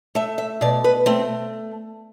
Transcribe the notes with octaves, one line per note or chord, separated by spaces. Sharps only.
A3 E5
E5
B2 D5
B4
A3 C4